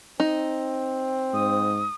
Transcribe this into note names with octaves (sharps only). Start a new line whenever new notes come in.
C4 D#4
G#2 D#6